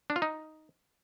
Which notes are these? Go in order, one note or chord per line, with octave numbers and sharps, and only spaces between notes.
D4
F4
D#4